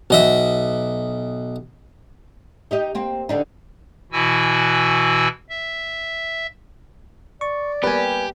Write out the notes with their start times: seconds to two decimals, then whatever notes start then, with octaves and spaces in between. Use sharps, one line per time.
0.10 B1 D#5 E5
2.71 D#4 G4 D#5
2.95 A#3 C4
3.29 D3 D4 D#4
4.12 B2 E3 E4 F#4 G#5 E6
5.49 E5
7.41 D5 C#6
7.83 G3 A#3 B3 G4 B4 G#5